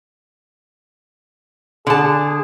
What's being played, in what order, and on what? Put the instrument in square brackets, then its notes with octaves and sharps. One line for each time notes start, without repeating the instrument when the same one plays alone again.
[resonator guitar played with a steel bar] D3 A5 [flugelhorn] G#4